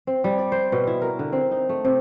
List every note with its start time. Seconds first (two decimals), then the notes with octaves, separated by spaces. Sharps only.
0.07 C4
0.24 G3
0.39 D5
0.52 C5
0.72 B2
0.87 E4
1.02 A#4
1.19 D3
1.33 C4
1.51 D#4
1.69 A3
1.85 C3